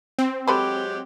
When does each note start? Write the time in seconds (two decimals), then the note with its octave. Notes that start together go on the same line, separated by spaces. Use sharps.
0.19 C4
0.47 F#3 G#3 G4 A4 B4 C5